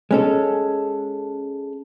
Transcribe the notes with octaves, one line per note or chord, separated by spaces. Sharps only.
G#3 C#4 A4